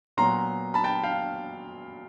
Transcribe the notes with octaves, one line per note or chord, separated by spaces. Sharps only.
A#2 F#3 B3 A#5 C6
A5 B5
G5 A5
F5 G5